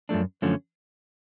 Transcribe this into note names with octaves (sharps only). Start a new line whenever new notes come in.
F#2 F3 A3 D4
F#2 D3 F3 A3 C#4